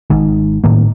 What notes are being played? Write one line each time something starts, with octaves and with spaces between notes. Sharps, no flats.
G#1 G#2 D#3
A2 D#3 A#3